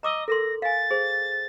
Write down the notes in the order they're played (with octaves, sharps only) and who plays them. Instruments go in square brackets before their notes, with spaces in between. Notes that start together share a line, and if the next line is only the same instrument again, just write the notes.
[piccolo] D#5 [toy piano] A#5 D6 E6
[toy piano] A4 A#4 C6 [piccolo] A#6
[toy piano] F5 G#5 [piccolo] A6
[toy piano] G#4 C5